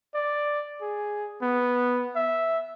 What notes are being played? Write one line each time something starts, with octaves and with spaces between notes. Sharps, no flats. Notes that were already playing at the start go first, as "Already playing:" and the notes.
D5
G#4
B3
E5